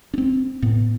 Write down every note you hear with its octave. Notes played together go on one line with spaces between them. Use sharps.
C#4
C4
A2 B3